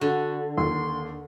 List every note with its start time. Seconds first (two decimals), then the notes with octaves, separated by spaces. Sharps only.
0.01 D3 F#4
0.58 D#2 C6